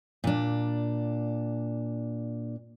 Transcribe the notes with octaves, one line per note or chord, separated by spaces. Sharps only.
A#2 D4